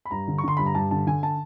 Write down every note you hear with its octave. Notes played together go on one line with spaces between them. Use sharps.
B5
G2 A#5
D3
C#6
D3 C6
G2 B5
A#5
G2 A5
D3 A5
D3 G#5
A5